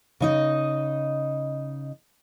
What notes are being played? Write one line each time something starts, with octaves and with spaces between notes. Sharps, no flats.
C#3 D#4 D#5